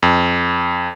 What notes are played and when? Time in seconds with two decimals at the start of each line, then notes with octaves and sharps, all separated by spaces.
0.03 F2